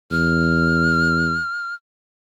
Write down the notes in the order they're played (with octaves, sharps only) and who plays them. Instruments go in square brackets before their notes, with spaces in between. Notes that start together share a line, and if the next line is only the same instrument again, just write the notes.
[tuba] E2 [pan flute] F6